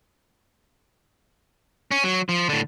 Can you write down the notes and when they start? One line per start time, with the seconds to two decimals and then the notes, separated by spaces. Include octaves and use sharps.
1.91 C#4
2.04 F#3
2.29 F3
2.49 A2 D3